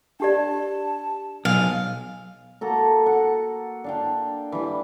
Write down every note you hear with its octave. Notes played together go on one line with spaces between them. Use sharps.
D4 G4 D5 A5
B1 F5 G#5
A#3 F#4 A4 A#5
F#5
D4 F5 G5
E3 G3